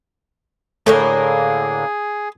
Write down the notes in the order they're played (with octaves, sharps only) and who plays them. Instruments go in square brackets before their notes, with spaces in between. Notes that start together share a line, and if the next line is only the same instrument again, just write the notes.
[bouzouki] A2 D3 A#3 [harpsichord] A3 C#5 [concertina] G#4